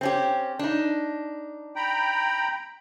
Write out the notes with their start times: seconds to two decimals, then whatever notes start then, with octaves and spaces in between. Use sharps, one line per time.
0.01 C4 C#4 G4
0.59 D4 D#4
1.76 G5 A#5 B5